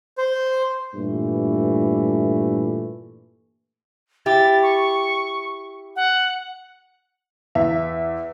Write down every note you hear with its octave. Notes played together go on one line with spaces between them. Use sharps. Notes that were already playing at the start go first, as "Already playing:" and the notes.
C5
G2 A#2 E3 A3
E4 G4 A6
C#6
F#5
E2 E5